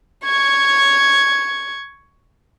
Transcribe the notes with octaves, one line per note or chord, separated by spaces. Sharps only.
C#6 G#6